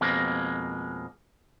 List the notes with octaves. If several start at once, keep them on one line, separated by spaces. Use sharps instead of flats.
F2 B2 G#3 A#3